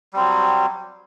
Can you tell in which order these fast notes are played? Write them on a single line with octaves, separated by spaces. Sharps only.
G3 C4 F#3